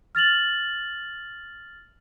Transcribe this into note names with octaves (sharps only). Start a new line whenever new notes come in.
F6 A6 F7 F#7